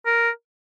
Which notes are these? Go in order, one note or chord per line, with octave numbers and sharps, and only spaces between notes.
A#4